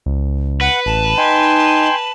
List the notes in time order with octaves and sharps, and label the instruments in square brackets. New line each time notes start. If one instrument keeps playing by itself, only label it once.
[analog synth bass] C#2
[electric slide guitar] B4 [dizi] F#5
[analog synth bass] A1 [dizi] A5
[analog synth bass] D#4 [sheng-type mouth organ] G5 G#5 C6